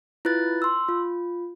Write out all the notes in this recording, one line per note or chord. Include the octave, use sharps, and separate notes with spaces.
E4 F4 B4 F#6 A6
C6 E6
F4